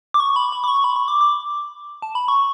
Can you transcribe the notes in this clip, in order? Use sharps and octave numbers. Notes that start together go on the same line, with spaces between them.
D6
C#6
B5
B5
D6
C#6
B5
C#6
D6
D6
A5
B5
C#6